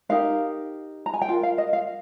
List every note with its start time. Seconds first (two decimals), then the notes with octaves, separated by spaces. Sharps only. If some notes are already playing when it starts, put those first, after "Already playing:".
0.09 D#4 G4 A#4 F5
1.06 A#5
1.14 G#5
1.22 G5
1.29 F4 A#4 F5
1.43 F5
1.58 D#5
1.73 F5